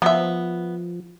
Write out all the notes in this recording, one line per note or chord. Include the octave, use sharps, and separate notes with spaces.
F3 B3 E5